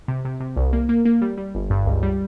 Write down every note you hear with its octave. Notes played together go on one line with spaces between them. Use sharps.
C3
C3
C3
C2
A#3
A#3
A#3
G3
G3
G1
G2
C#2
G3